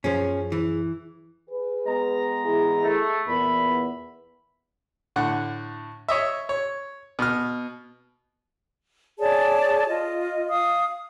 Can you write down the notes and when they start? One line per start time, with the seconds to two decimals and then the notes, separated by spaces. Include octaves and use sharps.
0.04 F#2 F3 C#4 G#4
0.52 E3
1.50 G#4 B4
1.86 G#3 B3 A#5
2.45 E3 E4 G#4
2.84 A3
3.27 E2 A#2 B3 E5 B5
5.16 A2 D3 F#5
6.08 C#5 D#5 E5
6.49 C#5
7.19 B2 F6
9.19 G#4 C#5 D5 A5
9.88 F4 D#5
10.49 F5 D#6